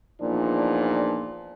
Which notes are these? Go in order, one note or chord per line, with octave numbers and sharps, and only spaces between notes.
E2 A#2 F3 D4 D#4